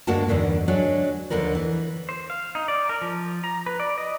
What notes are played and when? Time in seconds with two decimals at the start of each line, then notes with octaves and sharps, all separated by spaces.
0.07 D2 G2 G#3 A#3 F#4 A5
0.28 E2 G2 D3 D#3
0.68 F#3 G#3 D4
1.30 D#2 D3 F3 A#4 B4
1.55 E3
2.09 C5
2.30 F5
2.55 D#4
2.68 D5
2.89 A#4
3.02 F3
3.44 A#5
3.66 B4
3.80 D5
3.98 D#5